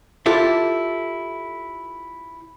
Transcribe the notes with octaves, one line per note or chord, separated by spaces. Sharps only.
E4 F4 G4 A4 D5